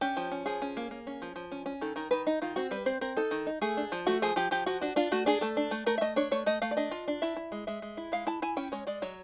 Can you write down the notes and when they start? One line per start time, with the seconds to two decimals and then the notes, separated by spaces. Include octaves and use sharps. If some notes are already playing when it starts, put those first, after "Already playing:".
0.01 C#4 G4
0.17 F3
0.32 C#4
0.46 F3 G#4
0.62 C#4
0.77 A#3
0.91 A#3
1.07 C#4
1.22 F3
1.36 F3
1.51 C#4
1.66 C#4
1.81 D#3 A4
1.96 D#3 A#4
2.11 D#3 B4
2.27 D#4
2.42 D#3 F4
2.56 C4 F#4
2.71 G3 B4
2.86 C4 C5
3.01 C4 A#4
3.17 D#4 A4
3.31 D#3
3.47 D#4
3.61 A3 G#4
3.77 D4
3.92 F3
4.07 A3 F#4
4.22 F3 G#4
4.36 F3 G4
4.51 F3 G4
4.66 F3 F#4
4.81 D4 F#4
4.96 D4 F4
5.12 A3 F#4
5.26 D4 G#4
5.41 A3 A4
5.57 D4
5.71 A3
5.86 A3 A#4
5.98 E5
6.01 A3 D#5
6.16 D4 C#5
6.31 A3 C#5
6.46 A3 D#5
6.62 A3 F5
6.71 D5
6.77 D4 D#5
6.91 F4
7.08 D4
7.22 E4 E5
7.36 E4
7.52 G#3
7.67 G#3 E5
7.82 G#3
7.97 E4
8.12 G#3 F5
8.27 E4 A5
8.42 E4 G#5
8.57 C#4 G5
8.72 G#3 C#5
8.87 G#3 D5
9.02 F#3 C#5